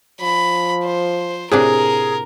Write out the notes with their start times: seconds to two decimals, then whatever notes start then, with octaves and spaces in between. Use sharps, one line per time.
0.20 F3 B5
0.84 C5
1.52 A2 C3 D4 G#4 A#4